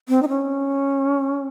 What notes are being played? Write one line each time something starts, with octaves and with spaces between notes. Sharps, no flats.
C4
D#4
C#4